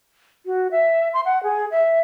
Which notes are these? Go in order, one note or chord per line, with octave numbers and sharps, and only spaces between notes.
F#4
E5
C6
F#5
G#4
E5